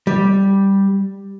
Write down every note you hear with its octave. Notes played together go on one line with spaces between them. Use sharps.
G3